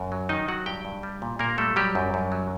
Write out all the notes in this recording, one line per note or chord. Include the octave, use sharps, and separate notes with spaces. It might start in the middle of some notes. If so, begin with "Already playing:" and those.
Already playing: F#2
F#3
D#3 D#4 D#5
F#3 F#4 F#5
G2 G4 G5
G2
G3
A#2
A#2 A#3 A#4
G3 A3 A4
F#3 G3 G4
F#2
F#2
F#3